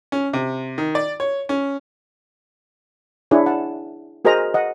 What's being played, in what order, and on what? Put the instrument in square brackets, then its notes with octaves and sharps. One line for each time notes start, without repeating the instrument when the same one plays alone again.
[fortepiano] C#4
C3
D#3
D5
C#5
C#4
[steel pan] D4 E4 G#4 C#5
F#5 A5
F#4 G#4 A#4 C5 D#5 A#5
D#5 F#5